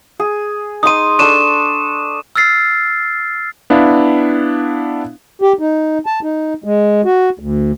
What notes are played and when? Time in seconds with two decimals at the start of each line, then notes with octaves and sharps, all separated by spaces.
0.20 G#4
0.83 D#4 C6 D#6 D#7
1.19 D4 A4 C#6 D#7 E7
2.36 E6 F6 A6 C7
3.70 B3 D4 E4 F5
5.42 G4
5.59 D#4
6.06 A5
6.23 D#4
6.64 G#3
7.05 F#4
7.39 D2